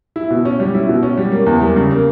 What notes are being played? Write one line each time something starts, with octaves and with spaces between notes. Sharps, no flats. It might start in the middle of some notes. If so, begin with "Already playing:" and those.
E4
B2
C#4
G3
E4
B2
C#4
G3
A#3
E2
G3
C#3
A#3